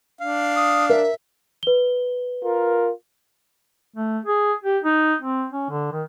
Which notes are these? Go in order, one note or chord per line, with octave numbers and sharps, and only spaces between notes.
D4 F5
D#6
A#4 E5
B4 G7
F4 A#4
A3
G#4
G4
D#4
C4
C#4
D3
D#3